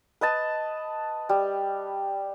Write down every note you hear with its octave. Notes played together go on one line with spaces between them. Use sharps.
B4 D#5 A5
G3